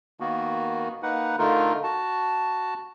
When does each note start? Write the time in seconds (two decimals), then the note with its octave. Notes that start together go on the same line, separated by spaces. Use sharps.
0.20 D#3 A#3 B3 F#4
1.03 A#3 D#4 B4 F#5
1.39 D3 A3 D#4 F4 A#4
1.83 F#4 A5